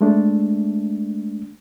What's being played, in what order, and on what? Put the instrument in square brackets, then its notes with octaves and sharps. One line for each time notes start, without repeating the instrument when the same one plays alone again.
[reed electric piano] G#3 A3 D4